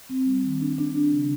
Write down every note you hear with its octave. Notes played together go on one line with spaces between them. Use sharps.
C4
G3
D#3
D4
D4
D4
C#3